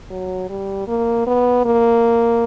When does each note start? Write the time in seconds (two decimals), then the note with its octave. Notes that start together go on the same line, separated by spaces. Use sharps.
0.10 F#3
0.49 G3
0.87 A#3
1.27 B3
1.65 A#3